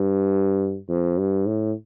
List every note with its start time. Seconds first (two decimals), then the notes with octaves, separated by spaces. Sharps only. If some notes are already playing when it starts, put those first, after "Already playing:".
Already playing: G2
0.89 F2
1.18 G2
1.46 A2